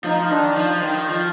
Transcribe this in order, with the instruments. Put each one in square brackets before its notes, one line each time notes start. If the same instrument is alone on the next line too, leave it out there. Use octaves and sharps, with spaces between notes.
[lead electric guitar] F3 [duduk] D#4
[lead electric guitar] D#3 [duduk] D4
[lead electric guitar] F3
D#3
F3